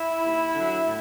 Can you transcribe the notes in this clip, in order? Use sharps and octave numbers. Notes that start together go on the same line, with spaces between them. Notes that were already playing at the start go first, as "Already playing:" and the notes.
Already playing: E4
D#2
D3 F#3
A2